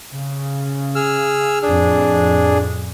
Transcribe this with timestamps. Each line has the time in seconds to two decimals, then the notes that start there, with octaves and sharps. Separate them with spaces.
0.12 C#3
0.95 G#4 E6 F6
1.62 F2 A2 D4 G#4